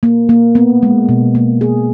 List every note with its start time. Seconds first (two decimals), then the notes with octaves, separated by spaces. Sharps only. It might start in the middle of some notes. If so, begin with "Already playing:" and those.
0.03 A#3
0.29 A#3
0.55 B3
0.83 G#3
1.09 B2
1.35 A#3
1.61 G#4